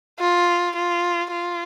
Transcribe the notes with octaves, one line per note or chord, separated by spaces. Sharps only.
F4
F4
F4